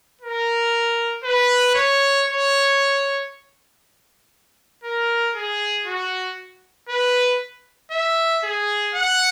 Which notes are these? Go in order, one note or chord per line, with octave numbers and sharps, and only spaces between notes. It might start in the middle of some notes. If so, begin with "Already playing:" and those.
A#4
B4
C#5
C#5
A#4
G#4
F#4
B4
E5
G#4
F#5